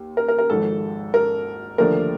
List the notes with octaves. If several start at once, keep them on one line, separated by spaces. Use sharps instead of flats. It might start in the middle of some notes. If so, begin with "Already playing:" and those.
Already playing: D#2
A#4
A#4
A#4
G#1 G#2 F3 A4
A#4
D#2 D3 F3 A3 D4 A#4